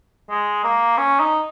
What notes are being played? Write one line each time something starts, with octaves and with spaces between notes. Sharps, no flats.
G#3
A#3
C#4
D#4